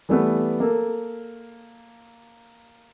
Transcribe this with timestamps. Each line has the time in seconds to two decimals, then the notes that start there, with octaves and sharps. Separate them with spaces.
0.09 E3 G3 A3 B3
0.60 A#3 A4